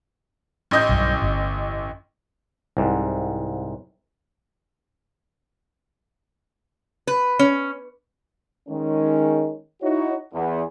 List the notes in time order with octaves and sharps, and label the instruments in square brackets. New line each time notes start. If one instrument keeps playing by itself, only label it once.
[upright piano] A1 D#5 G6
[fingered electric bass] B1 G2
G1
[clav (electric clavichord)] C2 G#2
[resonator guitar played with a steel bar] B4
C#4
[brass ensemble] D#3 G#3 C#4
D#4 E4 F#4 C#5
E2